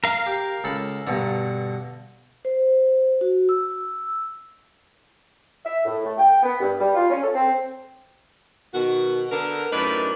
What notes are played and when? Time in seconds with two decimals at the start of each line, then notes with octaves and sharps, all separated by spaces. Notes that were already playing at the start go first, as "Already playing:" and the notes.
0.04 A#4 F5
0.26 G4
0.64 C#2 A4 B5
1.07 G2 B2 D3
2.45 C5
3.21 F#4
3.49 E6
5.65 E5
5.85 A2
6.06 A3
6.18 G5
6.43 B3
6.61 G2
6.79 G3
6.95 F4
7.09 C#4
7.23 A4
7.34 C4
8.74 B2 D#3 F#4
9.31 D3 B3 A#4
9.72 F#2 A2 D4 D#4 A#4 B4